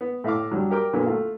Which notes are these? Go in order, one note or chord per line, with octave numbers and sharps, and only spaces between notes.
B3
A2 E5 F5 D6
F#3 G3 D4
G4 A#4 G5 D6
A#2 D3 F#3 B3
A3 F4 F5